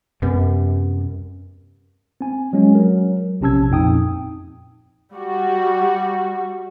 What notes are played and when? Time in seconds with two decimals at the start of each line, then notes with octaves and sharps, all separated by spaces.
0.22 F#2 C3 G3 B3
2.21 C4 G#5
2.53 F#3 G#3 C#4
2.75 F#3 A#4
3.41 A#1 C3 C#4 A5 E6 G#6
3.70 F2 A#2 D#4 G5 D#6
5.14 G3 F#4